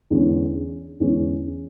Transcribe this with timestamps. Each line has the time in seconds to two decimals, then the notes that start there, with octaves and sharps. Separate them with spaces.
0.10 E2 D3 G#3 C#4
1.00 E2 D3 G#3 C#4